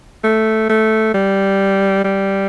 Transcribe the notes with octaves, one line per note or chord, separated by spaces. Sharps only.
A3
A3
G3
G3